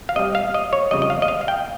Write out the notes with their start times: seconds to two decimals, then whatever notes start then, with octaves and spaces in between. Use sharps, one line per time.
0.09 F5
0.16 C3 G3 D#5
0.35 F5
0.54 D#5
0.73 C#5
0.91 F2 C#3 G3 D#5
1.02 D#5
1.10 F5
1.22 D#5
1.28 F5
1.41 F5
1.48 G5